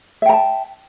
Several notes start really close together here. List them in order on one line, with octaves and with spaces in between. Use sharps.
E5 G5 A#5 A5